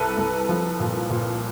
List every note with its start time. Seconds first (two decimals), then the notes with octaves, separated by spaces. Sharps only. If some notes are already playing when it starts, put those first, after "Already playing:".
Already playing: C2 A4 B4
0.18 C2
0.49 F3
0.80 A#2
1.10 A#2